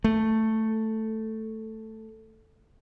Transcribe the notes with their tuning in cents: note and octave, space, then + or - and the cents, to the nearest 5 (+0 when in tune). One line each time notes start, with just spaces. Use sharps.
A3 +5